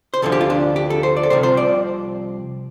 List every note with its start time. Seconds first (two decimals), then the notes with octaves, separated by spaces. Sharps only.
0.14 C5
0.22 D2 D3 F3 A4
0.32 G4
0.41 F4
0.50 D4
0.76 G4
0.90 A4
1.03 C5
1.17 D5
1.23 A4
1.30 C2 C3 F3 C5
1.43 C5
1.57 D5